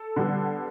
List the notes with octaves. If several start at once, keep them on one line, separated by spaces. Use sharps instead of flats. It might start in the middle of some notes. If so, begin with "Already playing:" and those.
Already playing: A4
D3 G3 B3